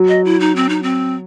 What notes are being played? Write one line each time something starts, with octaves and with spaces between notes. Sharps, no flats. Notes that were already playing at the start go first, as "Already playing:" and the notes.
Already playing: F#3
D#5
E4
D#4
C4
D#4
C4